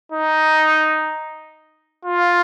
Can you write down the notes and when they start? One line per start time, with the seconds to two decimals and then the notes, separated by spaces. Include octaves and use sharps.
0.12 D#4
2.05 F4